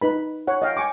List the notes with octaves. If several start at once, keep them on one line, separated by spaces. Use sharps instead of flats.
D#4 B4 B5
C#5 F#5
D#5 F5 G5
G5 G#5 C#6 D6